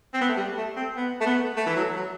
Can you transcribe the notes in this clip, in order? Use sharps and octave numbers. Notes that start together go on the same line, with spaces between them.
C4
B3
A3
G3
A3
C4
B3
A3
B3
A3
E3
F#3
F#3